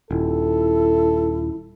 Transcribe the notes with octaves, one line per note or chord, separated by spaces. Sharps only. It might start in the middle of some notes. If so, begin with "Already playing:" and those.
D#1 E4 A4